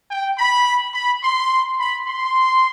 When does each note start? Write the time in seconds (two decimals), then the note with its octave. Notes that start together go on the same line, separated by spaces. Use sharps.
0.11 G5
0.38 B5
0.94 B5
1.23 C6
1.79 B5
2.07 C6